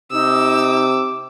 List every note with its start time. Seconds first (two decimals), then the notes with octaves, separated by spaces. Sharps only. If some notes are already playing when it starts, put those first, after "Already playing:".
0.13 C3 D#4 D6 E6